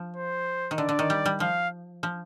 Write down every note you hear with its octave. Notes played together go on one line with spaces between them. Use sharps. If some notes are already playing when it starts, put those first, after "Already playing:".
Already playing: F3
C5
D#3
D3 D5
D3
D#3
G3
G3
F3 F5
F3